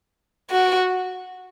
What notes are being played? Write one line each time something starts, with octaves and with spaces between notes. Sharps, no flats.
F#4